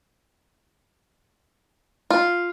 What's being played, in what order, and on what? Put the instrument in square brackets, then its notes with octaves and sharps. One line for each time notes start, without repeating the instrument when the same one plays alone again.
[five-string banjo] F4